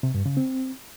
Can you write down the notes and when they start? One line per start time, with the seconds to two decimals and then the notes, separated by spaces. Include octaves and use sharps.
0.03 C3
0.14 G2
0.26 C#3
0.37 C4